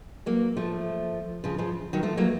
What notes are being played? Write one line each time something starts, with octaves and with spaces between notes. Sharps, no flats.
F#3 A#3
F3 A3
C#3 F3
C#3 F3
D#3 F#3
F3 A3
F#3 A#3